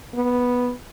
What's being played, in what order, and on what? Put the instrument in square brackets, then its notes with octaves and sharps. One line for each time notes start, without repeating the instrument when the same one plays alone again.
[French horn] B3